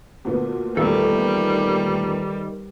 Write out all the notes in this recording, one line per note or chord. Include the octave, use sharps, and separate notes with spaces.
D2 A#2 B3
E2 A#2 D#3 G3 A3 A4